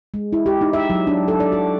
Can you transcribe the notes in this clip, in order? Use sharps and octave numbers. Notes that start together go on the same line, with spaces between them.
G#3
E4
G4
D#4
E5
F#3
D4
A4
D5
F#4